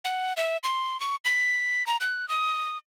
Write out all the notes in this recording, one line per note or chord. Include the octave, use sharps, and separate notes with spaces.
F#5
E5
C6
C#6
B6
A#5
F#6
D#6